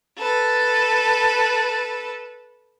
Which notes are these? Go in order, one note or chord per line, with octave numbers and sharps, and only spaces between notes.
A4 B4